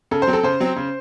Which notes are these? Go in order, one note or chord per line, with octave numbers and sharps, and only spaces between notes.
C#3 A4
C5
F#3 C4
A4
C#3 C5
F#3 C4
C#3